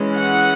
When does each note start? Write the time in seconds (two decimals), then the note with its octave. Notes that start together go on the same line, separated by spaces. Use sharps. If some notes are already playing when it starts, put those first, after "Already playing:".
Already playing: E3 G#3 C#4
0.17 F#5